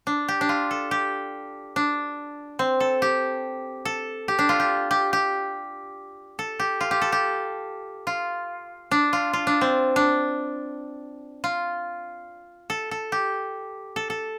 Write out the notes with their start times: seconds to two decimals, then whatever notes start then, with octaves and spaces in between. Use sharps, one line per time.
0.07 D4
0.28 G4
0.41 D4
0.49 F4
0.71 A4
0.91 G4
1.76 D4
2.59 C4
2.80 A4
3.02 G4
3.85 A4
4.28 G4
4.39 D4
4.49 F4
4.60 G4
4.91 G4
5.13 G4
6.39 A4
6.59 G4
6.81 F4
6.91 G4
7.02 A4
7.12 G4
8.07 F4
8.91 D4
9.13 F4
9.33 F4
9.47 D4
9.61 C4
9.96 D4
11.44 F4
12.70 A4
12.91 A4
13.12 G4
13.96 A4
14.10 A4